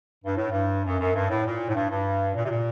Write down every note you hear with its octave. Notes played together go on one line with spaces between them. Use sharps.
G2
A2
G2
F#2
F#2
G2
A2
A#2
A2
G2
G2
A#2
C3
A#2